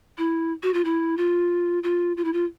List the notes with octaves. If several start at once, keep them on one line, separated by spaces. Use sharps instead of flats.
E4
F#4
F4
E4
F4
F4
F4
E4
F4